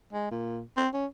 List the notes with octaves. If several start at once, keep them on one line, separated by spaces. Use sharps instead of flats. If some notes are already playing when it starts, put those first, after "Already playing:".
G#3
A#2
C4
C#4